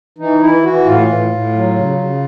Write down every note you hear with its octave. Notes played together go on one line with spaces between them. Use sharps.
E3 D#4
E3 E4
E3 F#4
A2 F4
A2
A2
F#3
C#3
C#3